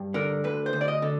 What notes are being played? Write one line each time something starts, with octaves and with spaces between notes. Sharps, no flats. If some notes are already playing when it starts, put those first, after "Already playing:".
Already playing: G2
D3 A#4
D2 B4
C5
D2
D5
D#5
D3